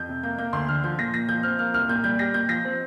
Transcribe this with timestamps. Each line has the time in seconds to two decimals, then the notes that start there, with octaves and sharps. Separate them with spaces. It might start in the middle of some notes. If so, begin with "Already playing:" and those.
Already playing: F2 G6
0.09 C3
0.23 A#3 G6
0.38 A#3 G6
0.53 D2 C6
0.68 D3 F6
0.84 F3 G6
0.98 A#2 A#6
1.13 A#2 A#6
1.28 F3 G6
1.43 C4 F6
1.59 A#3 F6
1.74 C2 F6
1.89 A#2 G6
2.04 G3 G6
2.19 G4 A#6
2.34 A#2 G6
2.49 F3 A#6
2.65 C4